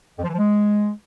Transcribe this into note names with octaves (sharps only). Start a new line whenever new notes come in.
F2
F3
E3
F3
G#3